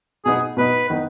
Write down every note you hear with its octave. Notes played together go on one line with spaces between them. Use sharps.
B2 B3 D#4 G#4
B2 B3 D#4 B4
D#3 B3 D#4